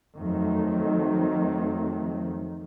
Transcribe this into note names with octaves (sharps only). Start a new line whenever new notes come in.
F2 D#3 F#3 A3